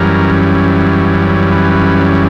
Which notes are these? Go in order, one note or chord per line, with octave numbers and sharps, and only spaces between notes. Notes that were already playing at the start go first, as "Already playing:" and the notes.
Already playing: F#2 E3 G3 C#4 A#4
B4